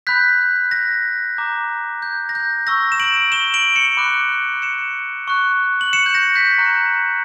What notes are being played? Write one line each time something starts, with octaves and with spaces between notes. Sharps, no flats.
B5 F#6 G6 B6
A#6
A#5 D6 G6
G6
A#6
G6
C#6 E6 G6 A#6
E7
D7 F#7
E7 G7
D7 F#7
C#7 E7
B5 D6 F#6
C#7 E7
C#6 F#6
F#7
C#7 E7
G6
A#6
G6 B6
A#5 C#6 F#6